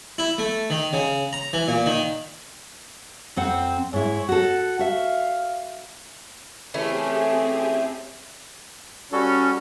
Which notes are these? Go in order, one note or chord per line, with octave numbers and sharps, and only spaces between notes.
E4
A3
D#3
C#3
A#5
E3
A#2
D#3
F2 C4 F#5
G#2 E4 C#5
F#4 A4 F#5
F#4 E5 F5
E3 A3 C4 C#4 G4 G#4
G3 C#4 F#4 A4